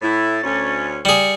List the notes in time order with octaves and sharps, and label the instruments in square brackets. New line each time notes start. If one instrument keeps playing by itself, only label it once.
[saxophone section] A2 E4 [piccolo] A6
[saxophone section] D2 C#4
[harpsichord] G3 G#4 [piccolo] C#7